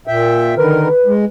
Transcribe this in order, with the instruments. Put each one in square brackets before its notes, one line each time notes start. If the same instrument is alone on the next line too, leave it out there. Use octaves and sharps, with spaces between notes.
[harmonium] A#2 E5 G5
[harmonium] D3 D#3 A#4 [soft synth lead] B4
[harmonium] G#3